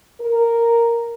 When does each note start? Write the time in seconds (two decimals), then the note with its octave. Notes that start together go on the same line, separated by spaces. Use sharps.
0.21 A#4